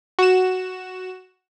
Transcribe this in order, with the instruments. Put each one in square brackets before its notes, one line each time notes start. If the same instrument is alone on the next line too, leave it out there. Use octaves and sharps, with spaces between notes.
[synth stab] F#4 E7